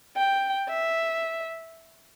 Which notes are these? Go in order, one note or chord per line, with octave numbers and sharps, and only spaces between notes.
G5
E5